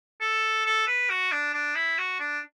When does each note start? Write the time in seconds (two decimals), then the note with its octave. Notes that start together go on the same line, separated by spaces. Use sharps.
0.21 A4
0.65 A4
0.87 B4
1.10 F#4
1.32 D4
1.54 D4
1.75 E4
1.98 F#4
2.19 D4